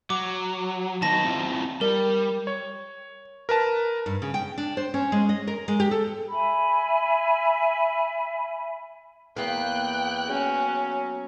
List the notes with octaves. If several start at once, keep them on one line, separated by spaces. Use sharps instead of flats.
F#3 D6
D#3 B3 D#4 A5 A#6
C4 E4 F4
G3 A#4
C#5
A#4 B4 A5
G2
C#3
G5
D4
C5
C#4
G#3
D#5
A#4
G#3
G4
A4
E5 G#5 B5
E2 A#3 B3 F5 G5 F#6
F#3 C#4